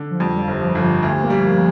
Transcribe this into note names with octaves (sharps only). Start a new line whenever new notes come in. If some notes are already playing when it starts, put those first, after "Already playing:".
Already playing: D3
F3
F2 G3
G3
F3
G1
F3
G1
F3
D2
A#3
G3
A#3